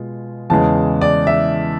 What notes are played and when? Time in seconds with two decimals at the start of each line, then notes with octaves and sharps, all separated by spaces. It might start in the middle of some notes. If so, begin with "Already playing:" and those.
Already playing: B2 G#3 F4
0.50 E2 C#3 E3 G#3 A5
1.01 D5
1.27 E5